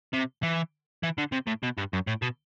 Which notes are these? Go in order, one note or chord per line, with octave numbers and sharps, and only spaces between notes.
C3
E3
E3
D3
C3
A2
B2
G2
F#2
A2
B2